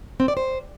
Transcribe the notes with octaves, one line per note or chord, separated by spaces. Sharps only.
C4
D5
C5